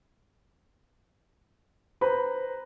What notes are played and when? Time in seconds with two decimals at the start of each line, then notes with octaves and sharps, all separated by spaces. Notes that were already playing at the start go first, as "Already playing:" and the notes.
2.01 B4 C5 A#5 B5